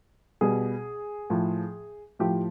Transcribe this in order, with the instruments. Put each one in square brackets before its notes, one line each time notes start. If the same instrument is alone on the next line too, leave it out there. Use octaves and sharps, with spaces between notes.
[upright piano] B2 G3 G#4
A2 F3
A2 F3 G4